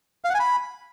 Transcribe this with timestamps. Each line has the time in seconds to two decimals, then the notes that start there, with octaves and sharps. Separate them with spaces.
0.24 F5
0.29 F#5
0.34 G#5
0.40 B5